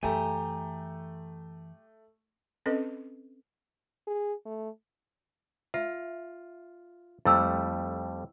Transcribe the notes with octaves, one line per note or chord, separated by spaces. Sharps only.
F#2 E3 A3 G4 G#5 A#5
C4 C#4 A4 B4 D#5
G#4
A3
F4 E5
F2 G3 A3 E4 E6